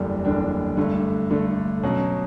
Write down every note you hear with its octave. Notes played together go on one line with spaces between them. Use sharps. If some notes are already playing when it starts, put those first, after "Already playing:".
Already playing: F#1 E2 D3 G3 D4
F#1 E2 D3 G3 D4
G2 D3 A3
G2 D3 A3
B2 F#3 C#4